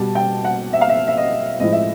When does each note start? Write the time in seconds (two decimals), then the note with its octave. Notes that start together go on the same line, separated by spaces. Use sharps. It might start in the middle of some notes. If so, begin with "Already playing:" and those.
Already playing: B2 G3 A5
0.15 G5
0.44 F#5
0.73 E5
0.81 F5
0.89 E5
1.08 E5
1.17 D#5
1.60 A2 F3 G#3 D#5
1.72 E5